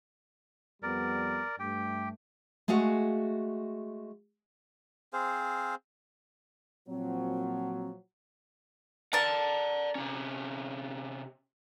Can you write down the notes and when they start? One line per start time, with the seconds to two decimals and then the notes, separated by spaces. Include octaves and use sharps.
0.83 F2 G3 B3 A#4 D5
1.59 G2 A3 G4 G5
2.68 G#3 A3 F#4 G#4 F5 F#5
5.13 C4 G#4 C5 F5
6.87 A#2 F3 F#3 C4
9.13 A#4 D5 F#5 A5
9.95 C3 C#4